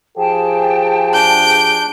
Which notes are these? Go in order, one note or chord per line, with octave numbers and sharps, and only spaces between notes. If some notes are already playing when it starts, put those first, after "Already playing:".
F3 G4 G#4 G5 A5
D4 G6 D7